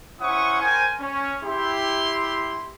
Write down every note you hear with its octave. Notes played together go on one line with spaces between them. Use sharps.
C#4 E4 C5 F#5 C#6 D#6
A#4 C5 G5 G#5
C#4
E4 G4 C6